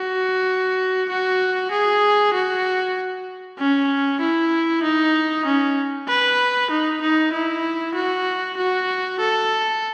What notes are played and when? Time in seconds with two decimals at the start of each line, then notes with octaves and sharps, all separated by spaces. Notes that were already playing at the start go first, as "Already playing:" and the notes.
Already playing: F#4
1.09 F#4
1.71 G#4
2.34 F#4
3.59 C#4
4.21 E4
4.83 D#4
5.46 C#4
6.08 B4
6.71 D#4
7.02 D#4
7.33 E4
7.95 F#4
8.57 F#4
9.20 A4